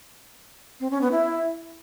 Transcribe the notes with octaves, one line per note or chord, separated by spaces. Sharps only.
C4
C#4
B3
E4